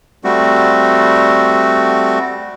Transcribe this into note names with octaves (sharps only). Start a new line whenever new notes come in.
G3 A3 C4 F#4